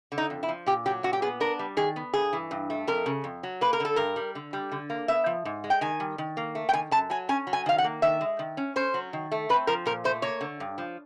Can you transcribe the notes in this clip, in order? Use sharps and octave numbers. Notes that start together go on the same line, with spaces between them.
D3
D#4
F2
E4
F3
A#2 G4
F#3 G4
A#2 F#4
G4
B3 G#4
D4 A#4
G3
D#3 G#4
B3
G2 G#4
E3
G2
A3
F2 A#4
C#3
F2
F#3
A#3 B4
A#4
D3 A4
G2 A#4
G3
D3
G3
D3
A#3
B3 E5
F3
G#2
G#3
G5
D#3 G#5
G3
D#3
A#3
A3
G5
D#3 G#5
F#2 A5
F#3 G#5
C#4 G#5
F#3
G#5
D#3 F5
F#5
A#3
D#3 E5
G#3
D#3
C#4
C#4 C5
F#3
D#3
A3
C4 B4
F3 A#4
A#2 A#4
A3 C5
A#3 C#5
D3
G2
F3